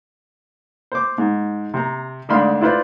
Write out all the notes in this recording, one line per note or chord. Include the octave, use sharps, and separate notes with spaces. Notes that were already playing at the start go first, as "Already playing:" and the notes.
C5 D6
G#2
C3 A#5
G#1 D2 D4 F5 B5 C6
E4 F4 B4 C5 D5